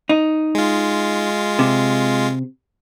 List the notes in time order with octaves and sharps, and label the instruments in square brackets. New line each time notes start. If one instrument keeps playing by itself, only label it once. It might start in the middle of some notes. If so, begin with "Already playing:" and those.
[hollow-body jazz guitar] D#4
[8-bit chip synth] G#3 F4
[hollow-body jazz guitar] C3